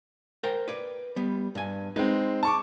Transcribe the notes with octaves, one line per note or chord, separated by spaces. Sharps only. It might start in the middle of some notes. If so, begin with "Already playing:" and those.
A#4 C5 G5
B4 D5
G3 B3
G2 G#5
G#3 C4 D#4 B4
A5 C#6 D6